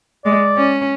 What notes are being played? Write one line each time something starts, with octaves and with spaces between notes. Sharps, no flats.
G#3 D5
C#4